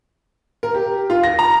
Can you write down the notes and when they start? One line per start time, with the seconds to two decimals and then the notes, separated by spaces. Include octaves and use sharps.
0.63 A#4
0.74 G4
1.10 F4
1.23 A#6
1.39 A#5